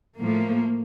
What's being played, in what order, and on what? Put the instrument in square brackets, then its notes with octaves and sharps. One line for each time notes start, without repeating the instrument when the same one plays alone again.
[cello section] A2 F3 A3 A#3